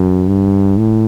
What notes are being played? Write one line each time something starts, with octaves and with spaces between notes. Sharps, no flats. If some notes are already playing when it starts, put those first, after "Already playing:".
Already playing: F#2
G2
A2